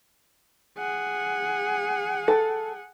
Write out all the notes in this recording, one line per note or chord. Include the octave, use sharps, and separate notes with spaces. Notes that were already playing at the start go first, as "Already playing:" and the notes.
G#4 F#5
A4